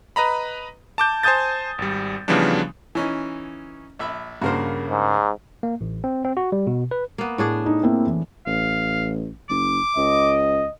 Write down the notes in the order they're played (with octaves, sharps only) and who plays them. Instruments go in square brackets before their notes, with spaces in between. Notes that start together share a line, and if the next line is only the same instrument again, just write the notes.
[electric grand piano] B4 D#5 A#5 B5
A5 D6 G6
C5 G#5 A5 D#6 G6 A6
G#1 G3
C#3 E3 F3 G3 B3 D4
[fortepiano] E3 C#4 D#4
A#1 E5 B5
[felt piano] G2 C#3 A#3 [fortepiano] F#4 A#4 C5
[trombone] G#2
[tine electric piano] A#3
A1
C4
C4
F#4
G3
B2
B4
[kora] A#3 B3
A2 D4 G#4
[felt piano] D#4
A#3 C4 E4
E3
[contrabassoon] A1 [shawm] F5
[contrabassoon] F#1 [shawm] D6
[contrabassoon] C#2 [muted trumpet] D#5